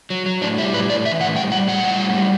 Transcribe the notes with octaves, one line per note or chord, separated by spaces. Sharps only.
F#3
F#3
A2 D4
G3 E4
A2 B4
A2 D5
E3 E5
A2 F#5
G3 G5
G3 F#5
A2 F#5
G3
A2
G3